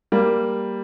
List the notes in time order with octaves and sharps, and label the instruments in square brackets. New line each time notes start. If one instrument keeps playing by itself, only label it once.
[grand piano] G3 A#3